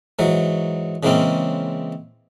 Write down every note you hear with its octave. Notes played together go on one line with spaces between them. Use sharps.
G#2 E3 F#3
C#3 E3 G#3 A#3 C4 C#4